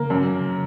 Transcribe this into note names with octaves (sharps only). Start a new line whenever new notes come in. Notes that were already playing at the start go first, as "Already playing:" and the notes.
Already playing: C#3 A#3
F#2